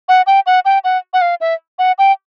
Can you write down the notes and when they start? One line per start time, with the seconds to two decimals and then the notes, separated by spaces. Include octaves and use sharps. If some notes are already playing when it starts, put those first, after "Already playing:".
0.09 F#5
0.27 G5
0.46 F#5
0.65 G5
0.84 F#5
1.13 F#5
1.21 F5
1.41 E5
1.79 F#5
1.99 G5